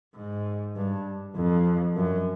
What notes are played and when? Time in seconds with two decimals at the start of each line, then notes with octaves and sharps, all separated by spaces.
0.16 G#2
0.76 G2
1.36 F2
1.96 F#2